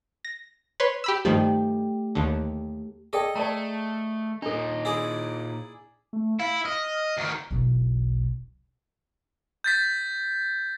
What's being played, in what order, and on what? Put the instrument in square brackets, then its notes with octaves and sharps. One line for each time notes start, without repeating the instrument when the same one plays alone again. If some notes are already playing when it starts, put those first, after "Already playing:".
[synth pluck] A#6
B4 C#5 C6
G4 B5 E6
[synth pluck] G2 D#3 F3 [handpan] A3 G4
[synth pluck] D#2 D3
[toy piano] G#4 D5 G5 [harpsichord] A4 D#5
[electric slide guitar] A3 [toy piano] D5 A5 A#5
[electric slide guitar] A#2 D#4 [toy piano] D4 A4
[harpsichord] E4 G#4 D5
[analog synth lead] A3
[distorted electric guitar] E4 [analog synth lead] F5
[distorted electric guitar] D#5 [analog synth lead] F6
[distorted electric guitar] D2 D#3
[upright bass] E1 B1
[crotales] G6 A6 B6